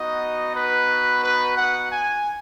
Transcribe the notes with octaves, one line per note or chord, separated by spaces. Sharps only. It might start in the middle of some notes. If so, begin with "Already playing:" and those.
Already playing: B3 D#4 F#4 D#5
B4
B4
F#5
G#5